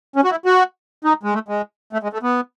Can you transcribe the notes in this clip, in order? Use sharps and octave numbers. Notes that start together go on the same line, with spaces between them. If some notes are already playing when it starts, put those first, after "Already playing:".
C#4
F#4
E4
F#4
D#4
G#3
A3
G#3
A3
G#3
A3
B3